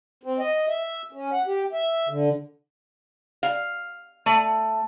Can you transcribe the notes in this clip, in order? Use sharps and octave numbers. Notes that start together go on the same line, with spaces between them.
C4
D#5
E5
C#4
F#5
G4
E5
D3
F5
A3